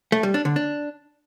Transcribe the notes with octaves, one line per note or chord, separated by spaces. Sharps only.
A3
G3
D4
D3
D4